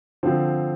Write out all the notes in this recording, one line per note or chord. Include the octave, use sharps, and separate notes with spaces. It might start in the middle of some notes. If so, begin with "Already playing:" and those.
D3 F3 C4